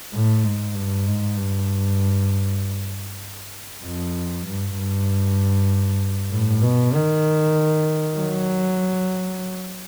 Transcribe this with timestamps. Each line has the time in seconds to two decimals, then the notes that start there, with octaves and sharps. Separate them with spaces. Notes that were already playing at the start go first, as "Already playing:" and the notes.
0.13 A2
0.44 G#2
0.75 G2
1.06 G#2
1.37 G2
3.84 F2
4.46 G2
4.77 G2
6.31 A2
6.62 B2
6.94 D#3
8.17 F#3